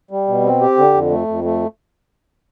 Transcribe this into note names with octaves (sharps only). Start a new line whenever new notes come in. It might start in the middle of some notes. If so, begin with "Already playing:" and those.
G3
B2
C4
G4
D3
F2
A3
F2
A3